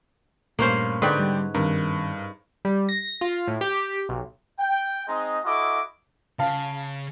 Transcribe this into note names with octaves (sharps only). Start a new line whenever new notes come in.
G2 A#2 A3 A#3 C#4 C5
G#2 D3 B4 C#5 D5 G5
G3
G2 D#3 C4 D4 A#4
G3
A#6
F4
A2
G4
B1
G5
G#3 C4 D#4 D#5
E4 F#4 A4 D#5 D6
C#3 F5 A5